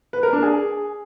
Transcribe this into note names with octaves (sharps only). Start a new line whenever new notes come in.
B4
A#4
D4
G#4